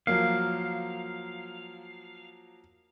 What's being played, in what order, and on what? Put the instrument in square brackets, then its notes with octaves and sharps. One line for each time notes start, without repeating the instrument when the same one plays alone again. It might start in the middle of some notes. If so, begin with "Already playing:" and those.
[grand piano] F3 F#3 A#3 [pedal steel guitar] F5